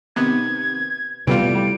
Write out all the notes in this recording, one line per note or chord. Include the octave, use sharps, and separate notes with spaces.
C3 D#3 B3 G#6
C3 E3 G3 A3 B3 F4 D7